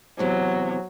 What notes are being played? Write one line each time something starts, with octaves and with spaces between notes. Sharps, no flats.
E2 C3 F#3